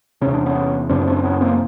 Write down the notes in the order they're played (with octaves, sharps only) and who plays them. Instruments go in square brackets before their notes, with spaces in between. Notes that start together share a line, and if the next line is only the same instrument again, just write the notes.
[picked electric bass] E2 C3 C#4
D4
B3 C#4
F#2 C#3 C4 D4
C4 D4
B3 C#4
A#3 C4